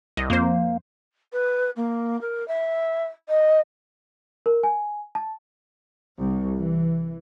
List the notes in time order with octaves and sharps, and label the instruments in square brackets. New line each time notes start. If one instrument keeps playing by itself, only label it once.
[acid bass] C2 [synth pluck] D#5
[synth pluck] F2 C5 [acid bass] A#3
[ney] B4
A#3
A#4
E5
D#5
[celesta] A#4
G#5
A5
[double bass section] C2
E3